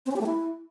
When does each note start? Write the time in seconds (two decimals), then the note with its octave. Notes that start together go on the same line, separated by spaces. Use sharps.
0.06 C4
0.11 C#4
0.16 G4
0.21 A3
0.26 E4